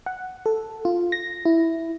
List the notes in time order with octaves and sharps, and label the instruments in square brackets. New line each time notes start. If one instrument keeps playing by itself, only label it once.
[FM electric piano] F#5
A4
F4
A#6
E4